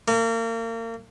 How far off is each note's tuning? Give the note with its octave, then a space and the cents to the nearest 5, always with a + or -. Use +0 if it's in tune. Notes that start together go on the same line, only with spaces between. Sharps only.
A#3 -35